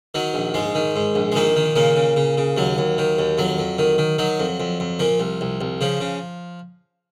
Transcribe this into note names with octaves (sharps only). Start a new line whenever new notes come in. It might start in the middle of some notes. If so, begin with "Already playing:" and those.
D#3 F#3
A#1
G#2 G#3
D#3
G#2
A#1
G#3
A#2 D#3 A#3
D#3
A#2 C#3 A#3
C#3
C#3
C#3
D#2 F#3
D#2
D#3
D#2
F2 F#3
F2
D#3
D#3
D#3 F#3
F2
F2
F2
A#2 F3
C2
C2
C2
C#3 F3
C#3